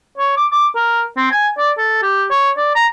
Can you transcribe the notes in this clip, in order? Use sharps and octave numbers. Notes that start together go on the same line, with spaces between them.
C#5
D6
D6
A#4
C4
G#5
D5
A4
G4
C#5
D5
A#5